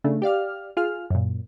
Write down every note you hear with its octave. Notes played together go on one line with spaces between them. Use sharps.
C#3 A3 D4
G4 D5 F5 F6
F4 G#4 F6
F#2 A#2